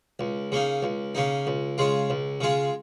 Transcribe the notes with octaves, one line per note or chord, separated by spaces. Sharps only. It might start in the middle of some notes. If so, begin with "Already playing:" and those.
C#2
C#3 A#3 D#4
C#2
C#3 A#3 D#4
C#2
C#3 G#3 F4
C#2
C#3 G#3 F4